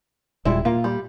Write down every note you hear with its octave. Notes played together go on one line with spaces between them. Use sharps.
D#1 A#2 G3 G#3 E4
A#2 A#3 F4
G3